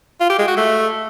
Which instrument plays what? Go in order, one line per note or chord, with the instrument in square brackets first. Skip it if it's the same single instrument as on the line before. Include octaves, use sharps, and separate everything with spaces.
[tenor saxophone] F4
G4
G#3
F#4
A3